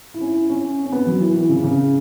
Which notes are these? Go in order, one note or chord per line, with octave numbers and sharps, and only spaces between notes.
E4
C#4
E4
C#4
C#4
B3
F#3
E3
E3
C#3
C#3